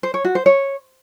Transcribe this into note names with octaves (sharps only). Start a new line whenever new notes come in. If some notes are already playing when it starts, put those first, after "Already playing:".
C5
C#5
F#4
C5
C#5